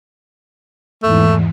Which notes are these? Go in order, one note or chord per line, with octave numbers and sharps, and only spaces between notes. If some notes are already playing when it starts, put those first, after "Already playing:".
E2 G#2 E3 A3